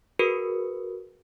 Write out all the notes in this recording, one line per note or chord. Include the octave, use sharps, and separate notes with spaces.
F#4 G#4 A#4 B4 C#7